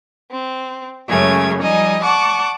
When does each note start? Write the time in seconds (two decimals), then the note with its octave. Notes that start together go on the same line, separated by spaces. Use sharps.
0.32 C4
1.08 F#2 C#3 G#3 A3 C#4 G#6
1.59 F3 G3 D#4 D#5 G#5
2.03 D5 F#5 A5 C#6 D6